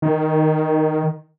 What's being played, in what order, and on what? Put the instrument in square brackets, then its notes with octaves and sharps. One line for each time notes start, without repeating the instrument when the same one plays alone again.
[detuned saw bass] D#3